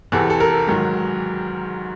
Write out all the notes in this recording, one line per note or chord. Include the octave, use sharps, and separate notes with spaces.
E2 C3 E3 A4
A4
A#4
G#2 D#3 F#3